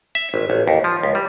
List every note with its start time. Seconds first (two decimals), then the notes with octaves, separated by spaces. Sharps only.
0.15 E5
0.34 G#1
0.50 A1
0.68 D#2
0.84 F3
1.03 C#2
1.15 G3